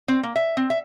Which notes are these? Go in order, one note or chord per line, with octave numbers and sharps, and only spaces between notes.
C4
A#3
E5
C4
E5